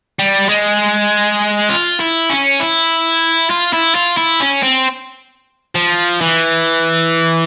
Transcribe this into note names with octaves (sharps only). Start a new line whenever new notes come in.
G3
G#3
F4
E4
C#4
E4
F4
E4
F4
E4
C#4
C4
F3
E3